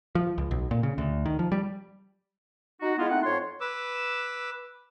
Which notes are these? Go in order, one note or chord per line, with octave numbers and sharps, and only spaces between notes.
F3
C#2
B1
A#2
C#3
D2
D#3
F3
G3
D#4 F#4
G#3 B3 E4 F4
A3 C4 D#4 F#5
F2 F4 C#5 C6
B4 D6 E6